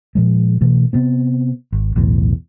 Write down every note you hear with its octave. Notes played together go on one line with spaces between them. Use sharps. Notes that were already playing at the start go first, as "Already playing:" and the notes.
A#2 F3 G#3
B2 E3 A3
C3 B3 C4
G#1
B1 E2 A2